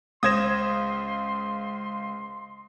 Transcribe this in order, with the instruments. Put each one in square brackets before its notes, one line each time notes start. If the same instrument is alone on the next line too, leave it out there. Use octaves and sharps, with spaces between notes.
[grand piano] C#2 C5 E7 [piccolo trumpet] C6 [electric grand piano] D#6 G#6 A#6